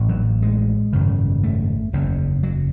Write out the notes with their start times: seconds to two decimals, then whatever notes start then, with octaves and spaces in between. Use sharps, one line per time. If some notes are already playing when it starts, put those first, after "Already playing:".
Already playing: A1 A2
0.09 F#3
0.42 G#3
0.93 G#1 F#2 C#3
1.43 A3
1.93 F#1 E2 C#3
2.43 F#3